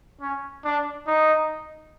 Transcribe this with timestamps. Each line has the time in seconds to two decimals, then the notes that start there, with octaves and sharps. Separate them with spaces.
0.21 C#4
0.64 D4
1.07 D#4